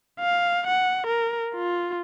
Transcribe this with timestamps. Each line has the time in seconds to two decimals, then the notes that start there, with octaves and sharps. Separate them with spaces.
0.20 F5
0.67 F#5
1.07 A#4
1.55 F4